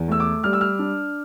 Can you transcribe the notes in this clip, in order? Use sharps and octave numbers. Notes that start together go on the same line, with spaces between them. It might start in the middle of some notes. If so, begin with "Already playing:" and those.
Already playing: E2
A3 E6
D6
G3 F6
E6
F6
D4